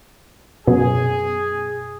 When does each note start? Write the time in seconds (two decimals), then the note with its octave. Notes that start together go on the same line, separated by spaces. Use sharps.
0.67 F#2 B2 G#4